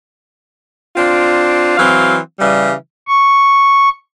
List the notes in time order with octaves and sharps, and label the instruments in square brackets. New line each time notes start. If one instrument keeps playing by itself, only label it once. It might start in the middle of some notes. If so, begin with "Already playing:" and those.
[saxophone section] C4 D4 F4
E3 F#3 C4 F5
C#3 E3 G3
[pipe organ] C#6